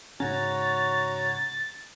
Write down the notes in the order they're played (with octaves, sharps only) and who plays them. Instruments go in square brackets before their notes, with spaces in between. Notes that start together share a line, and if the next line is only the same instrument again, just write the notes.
[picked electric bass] G#2 C#3 C#4 [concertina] F#4 C#5 A#5 [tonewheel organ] A6